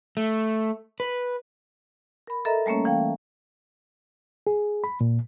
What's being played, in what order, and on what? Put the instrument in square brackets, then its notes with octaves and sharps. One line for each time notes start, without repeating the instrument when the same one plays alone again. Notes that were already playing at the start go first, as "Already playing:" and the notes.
[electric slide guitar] A3
B4
[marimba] A#4 B5
A4 A#4 D#5 E5 A#5
G3 A3 A#3 C#4 C#5
E3 F5 G5
[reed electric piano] G#4
B5
A#2